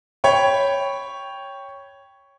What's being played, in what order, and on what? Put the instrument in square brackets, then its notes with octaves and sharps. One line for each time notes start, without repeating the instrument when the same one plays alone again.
[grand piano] C#5 G5 B5 C#6